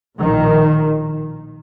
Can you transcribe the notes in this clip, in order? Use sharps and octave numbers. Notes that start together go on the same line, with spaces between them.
A#1 A2 D#3